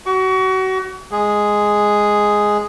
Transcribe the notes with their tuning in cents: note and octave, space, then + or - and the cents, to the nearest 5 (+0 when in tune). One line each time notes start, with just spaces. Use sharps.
F#4 +30 C#6 +35
G#3 +0 G#4 +0